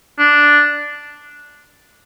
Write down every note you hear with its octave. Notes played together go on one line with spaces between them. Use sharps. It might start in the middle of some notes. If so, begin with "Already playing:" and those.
D4